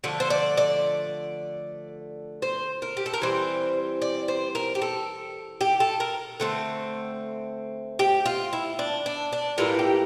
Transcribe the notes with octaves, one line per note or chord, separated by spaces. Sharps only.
D3 F3 A3
C5
D5
D5
C5
A#4
G4
A4
A#4
E3 G3 C4 C5
D5
C5
A#4
G4
A4
G4
A4
A#4
D3 A3 C4
G4
F4
E4
D4
D4
D4
A2 E3 G3 A#3 F4
G4